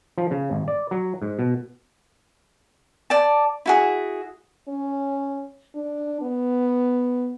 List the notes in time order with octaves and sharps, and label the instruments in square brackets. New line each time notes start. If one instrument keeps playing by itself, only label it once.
[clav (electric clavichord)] F3
C#3
G#1
D5
F#3
G#2
B2
[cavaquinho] D5 A5
E4 F#4 G#4
[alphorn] C#4
D4
B3